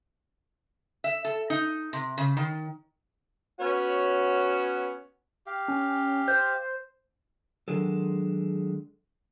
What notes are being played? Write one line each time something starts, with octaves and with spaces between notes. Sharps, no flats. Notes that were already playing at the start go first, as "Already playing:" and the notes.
E5
A4
D#4
C3
C#3
D#3
B3 C#4 F#4 C#5
G4 F5
C#4
C5 G6
D#3 F#3 G#3 D4 G#4 A4